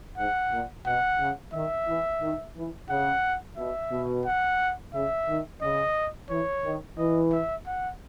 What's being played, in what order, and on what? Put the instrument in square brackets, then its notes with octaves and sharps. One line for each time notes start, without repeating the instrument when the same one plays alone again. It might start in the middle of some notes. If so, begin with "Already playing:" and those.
[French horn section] G#2 [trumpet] F#5
[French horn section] A#2
[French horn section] B2 [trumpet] F#5
[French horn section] C#3
[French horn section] D#3 [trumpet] E5
[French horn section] E3
D#3
E3
[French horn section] C#3 [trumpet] F#5
[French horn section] B2 [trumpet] E5
[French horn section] B2
[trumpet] F#5
[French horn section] C#3 [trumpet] E5
[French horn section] D#3
[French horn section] C#3 [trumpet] D#5
[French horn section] E3 [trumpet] C#5
[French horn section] D#3
[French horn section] E3 [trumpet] D#5
[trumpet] E5
F#5